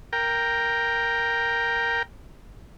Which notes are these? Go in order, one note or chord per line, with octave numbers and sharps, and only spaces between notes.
A#4 G5